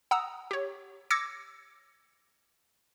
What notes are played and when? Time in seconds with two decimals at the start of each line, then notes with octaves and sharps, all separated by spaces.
0.11 F#5 A#5 D#6 E6
0.51 G4 C#5
1.10 D6 E6 G#6 A#6 C#7